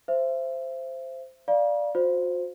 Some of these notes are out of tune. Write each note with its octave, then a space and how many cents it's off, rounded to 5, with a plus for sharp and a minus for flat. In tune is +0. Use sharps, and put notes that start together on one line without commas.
C5 +0 E5 +35
D5 +0 F5 +0 A#5 +45
F#4 -45 C5 +0